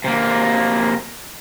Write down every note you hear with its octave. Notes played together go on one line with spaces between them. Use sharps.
C3 A#3